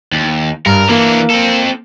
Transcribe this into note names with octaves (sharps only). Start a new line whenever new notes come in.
D#2
G2 A#4
E3 A#3 D4
C4 A4